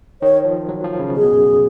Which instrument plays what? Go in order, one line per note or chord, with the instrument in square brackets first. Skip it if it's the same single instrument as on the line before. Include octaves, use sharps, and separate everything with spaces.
[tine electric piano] D#3 [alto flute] C#5
[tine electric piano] F3
F#3
F3
C#3
[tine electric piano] B2 [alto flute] G#4
[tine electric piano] F#2